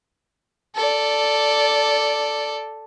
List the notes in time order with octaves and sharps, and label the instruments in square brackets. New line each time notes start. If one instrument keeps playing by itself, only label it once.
[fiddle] A4 D5